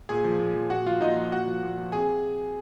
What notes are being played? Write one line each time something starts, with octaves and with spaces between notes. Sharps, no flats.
A#2 G#4 G#5
F3
A#2
F3
A#2 F#4 F#5
F3 F4 F5
A#2 D#4 D#5
F3
A#2 F#4 F#5
F3
A#2
F3
C3 G#4 G#5